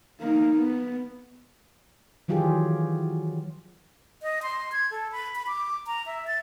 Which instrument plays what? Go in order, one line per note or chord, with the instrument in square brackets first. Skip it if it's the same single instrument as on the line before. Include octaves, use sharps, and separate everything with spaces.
[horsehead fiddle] A#3 D#4
B3
[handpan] D#3 E3 F#3 F4 G4 G#4
[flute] D#5
C6
G#6
A4
B5
B5
D6
A#5
E5
A6